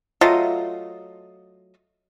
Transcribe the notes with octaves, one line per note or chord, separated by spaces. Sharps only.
F#3 A3 F4 D#5